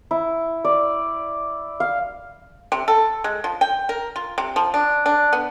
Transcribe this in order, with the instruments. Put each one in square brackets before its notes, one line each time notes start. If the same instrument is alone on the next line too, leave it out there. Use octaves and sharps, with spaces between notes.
[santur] E4
D5
F5
[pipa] C3
A4
G#3
F3
G5
A#4
F4
C3
F3
D4
D4
B3